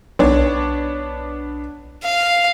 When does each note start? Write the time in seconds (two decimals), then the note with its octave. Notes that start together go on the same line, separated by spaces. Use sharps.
0.19 B1 B3 D4 C#5
2.04 F5